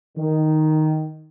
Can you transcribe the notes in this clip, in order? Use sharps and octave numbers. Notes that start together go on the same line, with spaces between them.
D#3